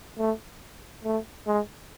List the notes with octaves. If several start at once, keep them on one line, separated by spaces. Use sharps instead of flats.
A3
A3
G#3